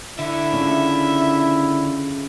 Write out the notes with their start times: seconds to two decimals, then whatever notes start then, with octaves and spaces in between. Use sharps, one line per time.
0.19 D3 E4 E5
0.52 C#3 F3 C#4